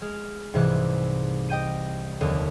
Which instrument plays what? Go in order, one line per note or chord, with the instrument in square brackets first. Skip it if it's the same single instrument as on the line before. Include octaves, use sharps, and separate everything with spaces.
[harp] G#3 F6
C2 G#2 C3 E3 E4 F#6
D#5 G5 G6 D#7
F1 D#2 D3 F#6 D#7